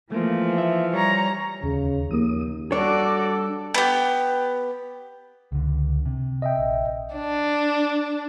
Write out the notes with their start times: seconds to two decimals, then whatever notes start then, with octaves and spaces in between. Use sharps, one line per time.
0.12 E3 F3 A3 A#3
0.58 E5
0.93 G3 C#5 A#5
1.63 D#2 C#3
2.11 D#2 F3 A#3 D#6
2.72 G3 D4 F#4 A4 C#5 D5 D6
3.74 B3 G4
5.52 C#2 D3
6.06 C3
6.42 D#5 E5 G5
6.58 A#1
7.14 D4